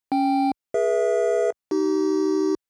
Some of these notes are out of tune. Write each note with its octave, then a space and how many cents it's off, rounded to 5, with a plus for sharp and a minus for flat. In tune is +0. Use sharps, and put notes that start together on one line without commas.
C#4 +0 G5 +0
G#4 +0 B4 -40 E5 +0
D#4 +0 G4 -35